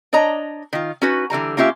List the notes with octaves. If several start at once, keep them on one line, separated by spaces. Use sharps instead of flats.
D4 C#5 D#5 A#5
D#3 F4
C#4 D#4 F#4 B4
D3 E3 G3 A#5
A#3 C#4 F4 G4 E5